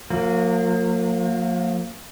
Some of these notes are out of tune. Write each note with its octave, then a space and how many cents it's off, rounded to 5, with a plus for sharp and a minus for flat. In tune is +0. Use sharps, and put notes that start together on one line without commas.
F3 +45 A#3 -25